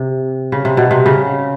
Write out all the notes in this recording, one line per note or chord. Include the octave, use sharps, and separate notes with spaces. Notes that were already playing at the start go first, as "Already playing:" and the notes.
Already playing: C3
C#3
C3
B2
C3
C#3